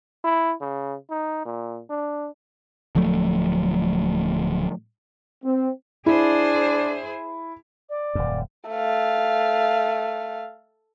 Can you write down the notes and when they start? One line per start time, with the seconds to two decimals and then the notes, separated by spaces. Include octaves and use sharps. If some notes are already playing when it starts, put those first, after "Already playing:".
0.24 E4
0.61 C#3
1.10 D#4
1.45 A#2
1.90 D4
2.95 D1 F3 F#3 A3
5.44 C4
6.06 D4 E4 G#4 C5
7.89 D5
8.15 D#1 F#2
8.70 A3 F5